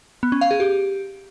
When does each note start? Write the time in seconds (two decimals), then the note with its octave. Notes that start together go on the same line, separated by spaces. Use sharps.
0.23 B3
0.32 C#4
0.41 F5
0.51 G#4
0.60 G4